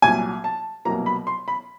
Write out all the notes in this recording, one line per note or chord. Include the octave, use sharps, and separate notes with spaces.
C2 A#2 F#3 G#5
A5
C2 B2 F#3 A#3 A#5
B5
C6
B5